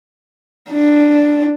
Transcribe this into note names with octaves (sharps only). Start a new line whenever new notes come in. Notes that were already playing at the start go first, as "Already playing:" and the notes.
D4